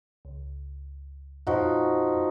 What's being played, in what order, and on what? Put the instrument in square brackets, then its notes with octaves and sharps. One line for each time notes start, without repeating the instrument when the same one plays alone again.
[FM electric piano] C#2
[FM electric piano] F2 A#2 [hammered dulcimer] F3 D#4 F#4